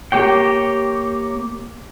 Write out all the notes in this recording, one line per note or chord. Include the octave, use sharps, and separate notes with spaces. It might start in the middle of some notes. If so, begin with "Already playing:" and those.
A#3 G4 C#5 G5